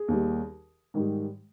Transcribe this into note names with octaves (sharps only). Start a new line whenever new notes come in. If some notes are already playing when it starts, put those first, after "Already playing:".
Already playing: G#4
D#2 D#3 G3
G#2 D#3 G3